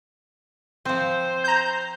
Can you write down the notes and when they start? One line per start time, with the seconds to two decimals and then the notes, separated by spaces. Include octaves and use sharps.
0.85 F3 C4 C5
1.44 A#5 G6